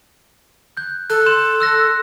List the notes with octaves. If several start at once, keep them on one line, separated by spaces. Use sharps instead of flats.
F#6 G6
A4 F#6
C6 G6 E7
E6 F#6 A#6